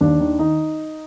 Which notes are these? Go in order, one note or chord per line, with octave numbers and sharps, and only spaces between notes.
D#2 D4
D#3
D#4